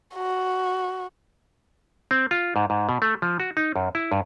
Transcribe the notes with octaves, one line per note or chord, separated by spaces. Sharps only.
F#4
C4
F4
G#2
G#2
B2
A3
F3
F#4
D#4
F#2
E4
G2